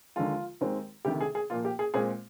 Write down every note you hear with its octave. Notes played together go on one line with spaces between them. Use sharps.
D#2 D3 F3 G#3 F4
D#2 D#3 G#3 C4
D2 C3 D#3 G4
G#4
G#4
A#2 F3 A#3 F4
G4
G#4
A#2 G#3 C4 G#4